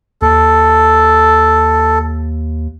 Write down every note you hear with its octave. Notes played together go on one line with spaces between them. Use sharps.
D#2 A4